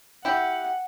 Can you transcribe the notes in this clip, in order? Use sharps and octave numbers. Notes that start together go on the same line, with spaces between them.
E4 G4 F#5